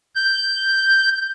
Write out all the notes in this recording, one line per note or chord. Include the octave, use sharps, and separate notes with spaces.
G6